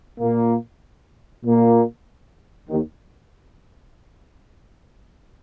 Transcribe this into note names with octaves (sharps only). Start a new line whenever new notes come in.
A#2 A#3
A#2 A#3
D#2 D#3